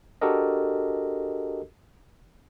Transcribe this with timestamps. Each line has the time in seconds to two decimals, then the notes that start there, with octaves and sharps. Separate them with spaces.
0.21 D4 F#4 G4 A4 A#4 D#5